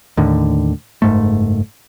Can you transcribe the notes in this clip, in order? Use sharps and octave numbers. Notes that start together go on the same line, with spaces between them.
D#2 A2 D3
F#1 G#2 A3